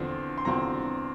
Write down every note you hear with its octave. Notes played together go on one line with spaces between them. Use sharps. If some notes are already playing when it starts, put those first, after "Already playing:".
Already playing: E2 D3 F3 C4
C6
E2 D3 F3 C4 A#5